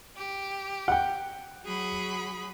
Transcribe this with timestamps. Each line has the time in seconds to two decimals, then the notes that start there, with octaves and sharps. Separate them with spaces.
0.15 G4
0.88 F#5 G5
1.63 F#3 G#4 B5